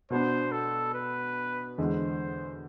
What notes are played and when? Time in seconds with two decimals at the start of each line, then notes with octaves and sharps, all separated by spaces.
0.10 B2 B3 D4 C5
0.52 A4
0.95 B4
1.78 E2 D3 G#3 C5